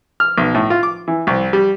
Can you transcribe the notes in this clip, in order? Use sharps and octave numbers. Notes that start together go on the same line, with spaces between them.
F6
B1
A2
F4
D6
E3
C2
G3